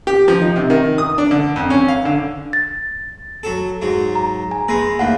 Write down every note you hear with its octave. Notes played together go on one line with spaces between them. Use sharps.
G4
F3
D#4
C3
D#3
D#6
D4
D3
F2
C#4
F5
D3
A6
F#3 A4
G#2 F#3
A#5
G#5
G#3 A#3 B4 A#6
D#2 A2 F5 F#5